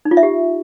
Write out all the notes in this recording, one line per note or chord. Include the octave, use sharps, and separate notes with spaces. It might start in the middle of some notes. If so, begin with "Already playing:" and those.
D#4
F4
E5
G4